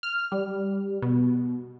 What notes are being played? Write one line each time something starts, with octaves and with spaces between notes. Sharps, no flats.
F6
G3
B2